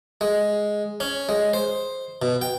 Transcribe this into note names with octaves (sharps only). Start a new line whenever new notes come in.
G#3
C#4
G#3
C5
B2
G5